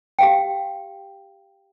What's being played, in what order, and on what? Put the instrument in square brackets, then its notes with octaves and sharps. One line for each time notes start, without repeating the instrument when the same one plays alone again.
[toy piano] G4 F5 G5